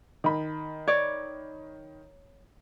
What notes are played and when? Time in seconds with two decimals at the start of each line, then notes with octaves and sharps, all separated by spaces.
0.24 D#3 B5
0.87 C#5 D5